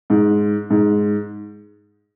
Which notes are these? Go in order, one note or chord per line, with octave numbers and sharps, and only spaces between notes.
G#2
G#2